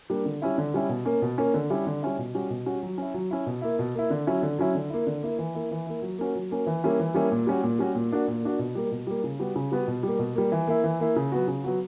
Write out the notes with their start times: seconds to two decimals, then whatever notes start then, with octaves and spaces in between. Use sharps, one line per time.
0.10 G3 A#3 D4
0.26 D3
0.42 G3 C#4 E4
0.58 D3
0.74 G3 C#4 E4
0.89 B2
1.05 A#3 C#4
1.22 B2
1.38 A#3 C#4
1.54 D3
1.70 G3 C#4 E4
1.87 D3
2.02 G3 C#4 E4
2.18 B2
2.35 G3 C#4 F#4
2.50 B2
2.66 G3 C#4 F#4
2.83 F#3
2.98 C#4 E4
3.14 F#3
3.31 C#4 E4
3.46 B2
3.62 A#3 E4
3.79 B2
3.95 A#3 E4
4.10 D3
4.27 F#3 C#4 E4
4.42 D3
4.59 F#3 C#4 E4
4.75 D3
4.90 A#3 E4
5.07 D3
5.23 A#3 E4
5.39 E3
5.55 A#3 E4
5.71 E3
5.87 A#3 E4
6.02 F#3
6.18 A#3 C#4 F#4
6.35 F#3
6.51 A#3 C#4 F#4
6.67 E3
6.83 G3 A#3 C#4 E4
7.00 E3
7.14 G3 A#3 C#4 E4
7.32 A#2
7.47 G3 C#4 F#4
7.63 A#2
7.79 G3 C#4 F#4
7.95 A#2
8.12 A#3 D4 F#4
8.28 A#2
8.43 A#3 D4 F#4
8.59 B2
8.75 G3 A#3
8.92 B2
9.07 G3 A#3
9.24 C#3
9.40 G3 B3 F#4
9.56 C#3
9.71 G3 B3 F#4
9.88 B2
10.03 G3 A#3
10.19 B2
10.35 G3 A#3
10.52 E3
10.67 A#3 E4
10.84 E3
11.00 A#3 E4
11.16 C#3
11.32 F#3 B3 F#4
11.48 C#3
11.64 F#3 B3 F#4